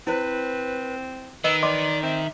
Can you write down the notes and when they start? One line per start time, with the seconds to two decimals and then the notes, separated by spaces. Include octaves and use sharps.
0.07 C4 E4 B4 C5
1.44 D#3 B4 D#5 E6
1.63 D5 D#5 C6 D6
2.03 C4 E5